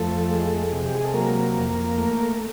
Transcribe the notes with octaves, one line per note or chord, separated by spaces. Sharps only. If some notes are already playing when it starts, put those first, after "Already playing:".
Already playing: F2 F3 A3 A4
G#3
C3
G4
G#4
A4
F#3 A#3 A#4
F2
A3